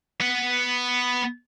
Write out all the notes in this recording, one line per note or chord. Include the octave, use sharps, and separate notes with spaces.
B3 F#5